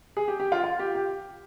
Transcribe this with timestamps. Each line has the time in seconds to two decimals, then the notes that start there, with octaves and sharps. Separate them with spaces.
0.17 G#4
0.28 G4
0.40 G4
0.52 F4
0.64 F4
0.79 G4
0.95 G4